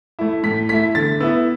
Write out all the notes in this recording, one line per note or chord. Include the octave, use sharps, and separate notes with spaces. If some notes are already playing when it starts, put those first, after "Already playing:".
A3 E4
A2 B6
A3 E4 B6
D3 A6
B3 E4 E6